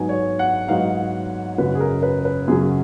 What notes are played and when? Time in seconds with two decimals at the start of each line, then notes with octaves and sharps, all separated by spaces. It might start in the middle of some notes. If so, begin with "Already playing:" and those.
Already playing: G#2 F#3 B3 D#4 G#5
0.09 C#5
0.39 F#5
0.68 G#2 F#3 B3 D#4 F5
1.58 F#2 C#3 F#3 B4
1.75 G#4
1.80 A#4
2.03 B4
2.25 B4
2.48 F#2 C#3 F#3 G#4